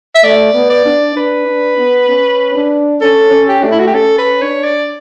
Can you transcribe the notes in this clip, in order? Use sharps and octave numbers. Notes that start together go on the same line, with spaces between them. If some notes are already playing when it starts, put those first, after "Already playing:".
E5
A3 D5
B3
D5
D4
D4 B4
D4
B3
C#4
D4
C#4 A4
C#4
G4
A3 D4
E4
F#4
G4
C#4 A4
B4
D4 C#5
D5